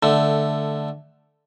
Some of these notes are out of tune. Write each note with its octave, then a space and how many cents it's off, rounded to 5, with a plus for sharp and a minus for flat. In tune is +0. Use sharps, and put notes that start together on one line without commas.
D3 +10 A3 +0